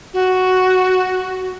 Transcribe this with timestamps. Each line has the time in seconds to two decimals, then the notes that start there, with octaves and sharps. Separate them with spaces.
0.14 F#4